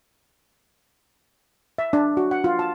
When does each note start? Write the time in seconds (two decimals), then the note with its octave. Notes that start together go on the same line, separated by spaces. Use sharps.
1.78 E5
1.93 D4
2.17 F#4
2.31 F#5
2.44 F4
2.59 A5